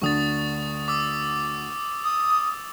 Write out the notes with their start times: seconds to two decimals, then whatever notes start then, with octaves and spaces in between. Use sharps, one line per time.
0.02 D2 D3 C#6 D#6 A6
0.88 D6 E6
2.04 D#6